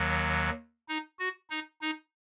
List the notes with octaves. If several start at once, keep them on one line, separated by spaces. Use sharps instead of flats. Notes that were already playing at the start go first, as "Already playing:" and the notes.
Already playing: D#2 D#3 F#3
D#4
F#4
D#4
D#4